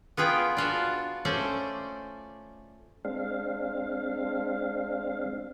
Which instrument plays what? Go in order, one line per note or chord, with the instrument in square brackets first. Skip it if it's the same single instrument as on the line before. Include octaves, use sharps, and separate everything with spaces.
[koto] B3 F4 G#4 G5
D4 F4 F#4
A3 C#4 C5 D5
[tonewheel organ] G#3 C4 D4 F5